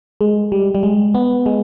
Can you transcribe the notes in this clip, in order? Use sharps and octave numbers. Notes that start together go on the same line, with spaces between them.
G#3
G3
G3
G#3
B3
G#3